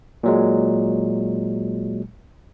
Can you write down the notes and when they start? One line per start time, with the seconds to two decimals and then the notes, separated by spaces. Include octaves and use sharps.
0.23 A#2 F#3 G#3